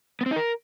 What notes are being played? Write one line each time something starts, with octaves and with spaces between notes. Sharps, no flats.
B3
C4
D#4
A#4